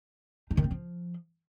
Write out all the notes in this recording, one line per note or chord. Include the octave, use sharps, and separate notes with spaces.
D#4
D#3
C4
F3